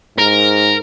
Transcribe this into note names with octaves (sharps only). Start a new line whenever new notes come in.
G#2 A#4